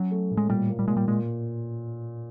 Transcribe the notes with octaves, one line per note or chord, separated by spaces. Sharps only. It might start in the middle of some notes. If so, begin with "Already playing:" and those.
Already playing: F#3 C#4
A3
A2
G#3
A#2 G3
A#3
G3
A#2 G#3
G3
A#2 G#3